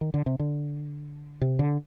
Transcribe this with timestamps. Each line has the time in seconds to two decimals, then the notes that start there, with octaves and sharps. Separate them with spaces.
0.01 D#3
0.14 D3
0.26 C3
0.39 D3
1.41 C3
1.59 D3